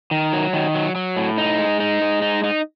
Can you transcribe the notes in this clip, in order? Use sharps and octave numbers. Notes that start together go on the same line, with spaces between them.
D#3
F#3
D#3
F#3
F#3
A2
D#4
G#3
D#4
G#3
D#4
D#4